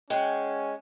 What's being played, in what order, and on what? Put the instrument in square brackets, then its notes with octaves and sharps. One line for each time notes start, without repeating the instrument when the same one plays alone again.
[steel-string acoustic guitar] G#3 [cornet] C#4 [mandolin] F#4 G#4 G5